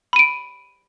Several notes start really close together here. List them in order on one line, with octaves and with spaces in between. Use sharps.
B5 D#7 D7